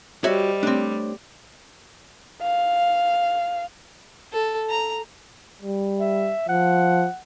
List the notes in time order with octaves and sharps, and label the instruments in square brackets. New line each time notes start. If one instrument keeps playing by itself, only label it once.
[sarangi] G3 [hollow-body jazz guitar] F#4 C#5 E5 [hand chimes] C5 D#5
[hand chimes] A3 C#5 [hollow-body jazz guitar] C4 D4
[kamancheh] F5
[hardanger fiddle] A4
A#5
[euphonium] G3
[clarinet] E5
[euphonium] F3 [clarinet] F#5